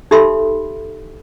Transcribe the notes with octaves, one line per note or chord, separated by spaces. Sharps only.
D#4 G4 A4 E5 B5 C6